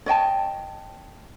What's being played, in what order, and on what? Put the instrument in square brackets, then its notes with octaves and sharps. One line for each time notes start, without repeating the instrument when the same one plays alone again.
[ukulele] C#5 D#5 G5 A5